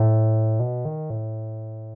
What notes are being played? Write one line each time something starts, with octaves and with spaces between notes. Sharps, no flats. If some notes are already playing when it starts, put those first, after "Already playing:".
Already playing: A2
B2
D#3
A2